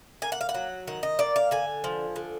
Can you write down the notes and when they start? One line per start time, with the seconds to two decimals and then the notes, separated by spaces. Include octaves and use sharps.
0.22 A#3 G#5
0.32 F#5
0.41 F5
0.49 F#5
0.54 F#3
0.87 D#3 F#5
1.03 D#5
1.19 A#3 D5
1.36 F5
1.51 D3 G#5
1.84 F3
2.16 D3